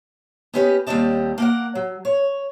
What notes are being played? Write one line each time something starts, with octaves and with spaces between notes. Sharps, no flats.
B3 C#4 G4 B4 D#5
D#2 G#2 G3 C4 D#5 A5
A#3 A#4 F#5
F#3
C#5